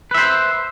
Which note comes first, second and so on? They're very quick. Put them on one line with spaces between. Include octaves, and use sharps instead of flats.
B4 E5 C5